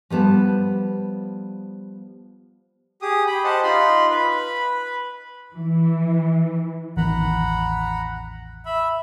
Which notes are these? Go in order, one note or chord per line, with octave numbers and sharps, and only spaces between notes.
F3 G3 B3 A5
G4 G#4 D#6
G5 B5
G4 C5 D#5 F#5 A5
D#4 F4 B5 C6
B4 B5
E3
A1 E2 D#3 F#5 A#5 B5
E5 B5